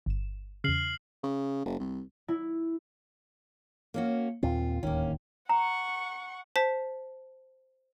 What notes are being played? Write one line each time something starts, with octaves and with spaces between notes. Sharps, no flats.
G1 E7
E2 C#3 F6 C7 F#7
C#3
F#1
C2
E4
A#3 C#4 F#4
D#2 A#2 C4 F4
D1 D#2 D#3 A#3 C#4
F#5 A#5 C#6
C5 A5 B6